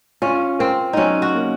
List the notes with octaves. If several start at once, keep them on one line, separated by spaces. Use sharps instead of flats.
C#4 F4
C4 A#4
F#3 C#4 D#4
F#4
A#3